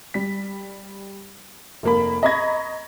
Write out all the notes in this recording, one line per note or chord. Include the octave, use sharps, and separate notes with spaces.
G3 B6
F1 A#3 B5
D#5 A#5 B5 C#6 G#6 A#6